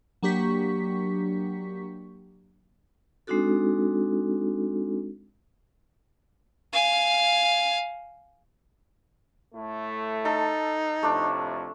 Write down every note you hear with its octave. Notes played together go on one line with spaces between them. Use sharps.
F#3 A#3 D4 G4 C#6 B6
G#3 C4 D4 D#4 F#4 A4
F5 G#5
A2 A3
D#4 A4
F2 A2 C3 A3 D4